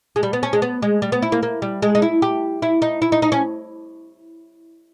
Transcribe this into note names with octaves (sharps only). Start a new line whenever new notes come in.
G#3
G3
B3
C#4
G#3
B3
G#3
G3
B3
E4
A#3
A#3
G3
G#3
D#4
E4
G4
E4
D#4
E4
D#4
D#4
C#4